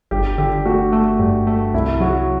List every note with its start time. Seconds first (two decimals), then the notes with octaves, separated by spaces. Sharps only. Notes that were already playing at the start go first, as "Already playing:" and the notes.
0.11 G1 G4
0.38 D3 G4
0.65 A3 F#4
0.92 A3
1.19 G2
1.47 A3
1.74 C2 E4
2.00 F#3 F#4